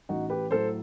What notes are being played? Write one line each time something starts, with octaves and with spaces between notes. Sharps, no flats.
A1 D#4 F#4
G4 B4
A2 F#3 A4 C5